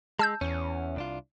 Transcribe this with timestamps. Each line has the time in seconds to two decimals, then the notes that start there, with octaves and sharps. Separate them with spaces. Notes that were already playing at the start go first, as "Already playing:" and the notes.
0.19 G#3 A5 E6 G6
0.41 E2 C#4
0.96 C2 D4 F4